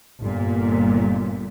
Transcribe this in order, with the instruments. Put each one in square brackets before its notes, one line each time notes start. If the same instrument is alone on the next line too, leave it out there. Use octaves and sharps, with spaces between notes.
[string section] G1 A#2